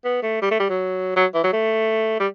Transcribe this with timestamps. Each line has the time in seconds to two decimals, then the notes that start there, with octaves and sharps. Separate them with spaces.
0.04 B3
0.23 A3
0.42 G3
0.51 A3
0.60 G3
0.69 F#3
1.16 F#3
1.34 E3
1.44 F#3
1.53 A3
2.20 G3